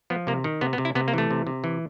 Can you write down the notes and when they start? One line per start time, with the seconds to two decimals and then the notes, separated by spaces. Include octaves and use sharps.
0.10 F3 B3
0.27 C3 A#3
0.44 D#3
0.61 C3 B3
0.73 B3
0.78 C3
0.85 E4
0.95 C3 B3
1.08 A#3
1.14 E3 A3
1.31 C3
1.47 C3
1.64 E3